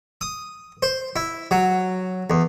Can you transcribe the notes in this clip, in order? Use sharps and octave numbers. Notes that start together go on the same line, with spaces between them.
D#6
C5
E4
F#3
E2